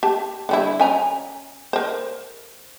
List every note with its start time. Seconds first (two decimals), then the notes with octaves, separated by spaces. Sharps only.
0.03 G4 A5
0.49 D3 G3 E4
0.80 C#4 G#5 A#5
1.73 A#4 C5